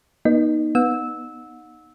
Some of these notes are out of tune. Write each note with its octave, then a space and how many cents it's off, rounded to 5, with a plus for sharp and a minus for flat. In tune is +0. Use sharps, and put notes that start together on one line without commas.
B3 -40 D#4 +0 D#5 -30
B3 +0 F#5 -35 E6 -15